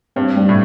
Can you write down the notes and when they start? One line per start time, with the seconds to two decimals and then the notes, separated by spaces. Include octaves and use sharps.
0.16 G2 C4
0.36 G3
0.49 A2